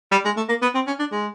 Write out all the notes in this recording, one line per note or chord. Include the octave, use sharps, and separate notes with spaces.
G3
G#3
A3
A#3
B3
C4
C#4
D4
G#3